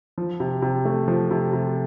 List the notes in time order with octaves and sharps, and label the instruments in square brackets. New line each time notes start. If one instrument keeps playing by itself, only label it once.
[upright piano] F3
C3
C3
A3
F3
C3
C3